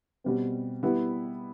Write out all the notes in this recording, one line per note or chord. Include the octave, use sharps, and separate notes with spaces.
B2 G3 C4
G3 B3 E4